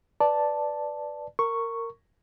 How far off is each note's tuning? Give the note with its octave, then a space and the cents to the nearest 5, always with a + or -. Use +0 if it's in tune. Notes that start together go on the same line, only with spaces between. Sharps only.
B4 +0 D5 +0 A5 +0
A#4 -20 C#6 +0